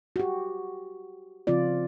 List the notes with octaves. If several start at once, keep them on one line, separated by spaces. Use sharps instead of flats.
F#4 G4
C#3 F3 C4 F4 D5